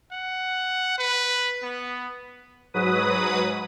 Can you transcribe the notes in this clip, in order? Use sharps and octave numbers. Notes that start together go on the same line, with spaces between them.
F#5
B4
B3
G#2 F#3 B4 D#6